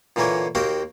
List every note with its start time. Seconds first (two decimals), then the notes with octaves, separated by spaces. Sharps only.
0.16 A#2 D3 E3 A#3 A#4 C#5
0.55 D#2 A#3 F#4 A#4 C5 G5